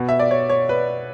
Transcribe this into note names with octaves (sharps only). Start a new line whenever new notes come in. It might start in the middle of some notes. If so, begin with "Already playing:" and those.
Already playing: B2
E5
D5
C#5
C#5
B4